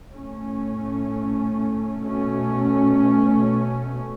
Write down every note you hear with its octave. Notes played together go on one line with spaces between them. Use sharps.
A2 A3 C#4
B2 A3 C#4